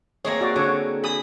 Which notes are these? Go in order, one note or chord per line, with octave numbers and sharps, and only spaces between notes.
A#3 C4 G#4 C#5 D#5
F#4 D5
D3 F#4 A4 C#5
G#4 B5 D#6